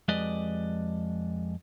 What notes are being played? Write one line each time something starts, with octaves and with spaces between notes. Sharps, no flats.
F2 G#3 G4 B4 D5 D#5